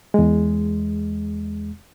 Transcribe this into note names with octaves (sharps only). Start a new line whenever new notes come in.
E2 G#3